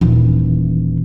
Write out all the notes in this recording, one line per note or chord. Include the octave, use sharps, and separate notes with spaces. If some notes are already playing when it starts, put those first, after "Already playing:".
D#1 E3